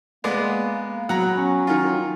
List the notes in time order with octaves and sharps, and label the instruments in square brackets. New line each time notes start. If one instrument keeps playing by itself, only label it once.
[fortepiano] G#3 B3 D5 [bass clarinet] A#3
[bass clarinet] A#3
[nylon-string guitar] F#3 [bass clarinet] B3 [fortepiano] F#5 A#5
[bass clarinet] C#4
[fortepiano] D#3 F4